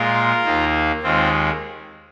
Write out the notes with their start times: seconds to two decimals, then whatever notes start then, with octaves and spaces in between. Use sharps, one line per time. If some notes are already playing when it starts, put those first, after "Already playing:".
Already playing: A#2 G#3 F4 A#4
0.44 D#2 D#3 A#3
1.03 D#2 D#3 G#3 C4 F4